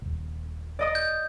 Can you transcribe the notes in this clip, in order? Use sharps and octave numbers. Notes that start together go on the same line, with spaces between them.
D#1 G#1
D5 D#5 D#6
G6